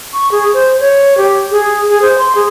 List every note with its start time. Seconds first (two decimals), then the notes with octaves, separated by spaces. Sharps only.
0.13 C#6
0.32 G#4
0.54 C5
0.80 C#5
1.18 G4
1.51 G#4
1.89 G#4
2.02 C5
2.18 C6
2.35 G#4